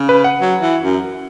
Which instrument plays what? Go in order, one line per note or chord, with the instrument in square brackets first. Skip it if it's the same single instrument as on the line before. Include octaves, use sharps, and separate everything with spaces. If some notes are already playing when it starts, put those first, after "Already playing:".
Already playing: [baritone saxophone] C#3
[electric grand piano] B4
F#5
[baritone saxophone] F#3
E3
F#2